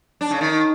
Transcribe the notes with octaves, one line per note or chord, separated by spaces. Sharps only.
D4
C#3
D#3